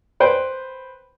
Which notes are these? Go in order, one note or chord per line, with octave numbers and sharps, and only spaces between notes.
B4 C5 G5